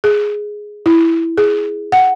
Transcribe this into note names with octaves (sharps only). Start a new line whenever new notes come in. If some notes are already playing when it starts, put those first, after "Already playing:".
G#4
E4
G#4
F#5